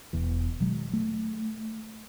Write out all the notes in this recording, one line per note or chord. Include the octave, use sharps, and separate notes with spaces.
E1 E2 E3
B2 D#3 F#3 G#3
A3